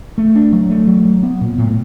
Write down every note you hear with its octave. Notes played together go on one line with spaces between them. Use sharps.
A3
D4
F#3
A3
F#3
F#3
B3
A#2
A2